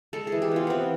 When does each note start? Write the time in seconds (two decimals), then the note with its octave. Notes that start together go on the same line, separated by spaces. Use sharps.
0.13 G#3 A4
0.27 E3 G#4
0.42 G4
0.51 B3 F4
0.67 E3 B3 C4